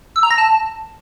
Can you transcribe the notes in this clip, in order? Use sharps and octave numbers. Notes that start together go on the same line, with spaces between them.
E6
A#5
A#6
A5